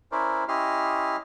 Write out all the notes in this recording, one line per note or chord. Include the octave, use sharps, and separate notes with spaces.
C#4 E4 A#4 C5 D5
C#4 E4 G4 D#5 C6 F6